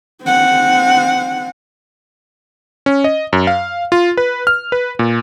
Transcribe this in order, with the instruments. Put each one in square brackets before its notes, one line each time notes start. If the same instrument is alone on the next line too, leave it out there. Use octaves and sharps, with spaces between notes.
[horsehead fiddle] C4 F#5
[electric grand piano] C#4
D#5
F#2
F5
F4
B4
F6
B4
A#2